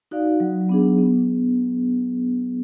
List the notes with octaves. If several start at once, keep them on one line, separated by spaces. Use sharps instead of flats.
D#4 F#4 D5 F5
F#3
B3 D4 G#4
B3